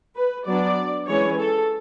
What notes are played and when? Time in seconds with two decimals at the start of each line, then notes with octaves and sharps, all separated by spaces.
0.16 B4
0.46 F#3 B3 D4 D5
1.07 E3 G#3 C#4 C#5
1.39 A4